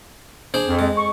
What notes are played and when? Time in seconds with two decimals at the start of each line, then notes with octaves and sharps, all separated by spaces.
0.54 D4 G#4 C5
0.67 F2
0.79 G#3
0.97 C#6